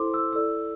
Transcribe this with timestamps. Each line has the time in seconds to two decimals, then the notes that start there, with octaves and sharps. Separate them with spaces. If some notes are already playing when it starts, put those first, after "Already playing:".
Already playing: E4 A4 C5 C6 D6
0.14 E6
0.33 E4 A4 D5 E6